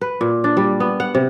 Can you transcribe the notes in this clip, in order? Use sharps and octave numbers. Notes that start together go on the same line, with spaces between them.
B4
A#2
D4
G3
B3
F#5
C3